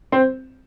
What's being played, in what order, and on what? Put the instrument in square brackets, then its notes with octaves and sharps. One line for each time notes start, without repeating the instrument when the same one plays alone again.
[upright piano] C4